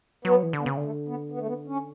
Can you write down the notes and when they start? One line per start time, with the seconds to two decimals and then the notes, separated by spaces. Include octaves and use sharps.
0.25 F#3 B3
0.43 E3
0.53 D3
0.61 B3
0.66 C#3
0.77 D3
0.84 A3
1.08 B3
1.32 B3
1.39 A3
1.47 B3
1.67 C#4